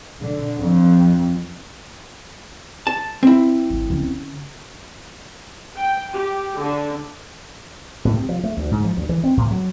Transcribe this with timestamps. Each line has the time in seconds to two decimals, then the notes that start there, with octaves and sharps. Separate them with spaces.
0.21 D3
0.57 F2
2.87 A5
3.23 C4 E4
3.70 G#1 D2
3.90 D3 C#4
5.77 G5
6.14 G4
6.59 D3
8.05 A2
8.16 C3
8.29 F3
8.44 A3
8.57 D2
8.71 G#2
8.84 F3
8.97 D2
9.09 E3
9.24 C4
9.37 A2
9.51 F#3